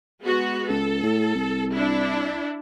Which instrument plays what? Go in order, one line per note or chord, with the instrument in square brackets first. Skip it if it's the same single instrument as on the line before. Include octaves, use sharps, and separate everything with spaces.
[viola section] G#3 B3 F#4
[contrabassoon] C#2 [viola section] A4
[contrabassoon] A2
C2
[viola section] D4 E4